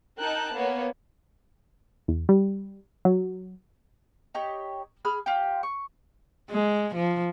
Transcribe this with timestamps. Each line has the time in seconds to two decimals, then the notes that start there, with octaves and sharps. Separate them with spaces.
0.19 D#4 A#4 G5 A5 F#6
0.54 A#3 B3 C#5
2.08 E2
2.29 G3
3.05 F#3
4.35 D#4 G4 C#5
5.05 G#4 B5 F6
5.26 F4 G4 G5
5.63 C#6
6.51 G#3
6.95 F3